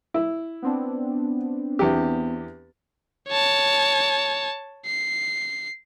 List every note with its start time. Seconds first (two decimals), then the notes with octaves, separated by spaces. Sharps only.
0.14 E4
0.62 B3 C4 D4
1.79 E2 G4
3.29 C#5 A5
4.86 C7